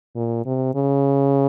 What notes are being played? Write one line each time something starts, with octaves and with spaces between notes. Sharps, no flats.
A#2
C3
C#3